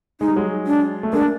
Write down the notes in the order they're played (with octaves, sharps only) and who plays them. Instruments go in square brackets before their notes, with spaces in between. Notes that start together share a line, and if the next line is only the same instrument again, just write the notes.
[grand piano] G#3 [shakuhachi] D#4
[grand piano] G3
F#3 G#3
[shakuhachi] D4
[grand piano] A3
[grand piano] G#3 A#3 [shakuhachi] D4